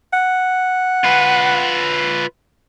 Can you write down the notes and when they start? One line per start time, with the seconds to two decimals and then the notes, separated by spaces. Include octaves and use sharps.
0.13 F#5
1.05 F4 B4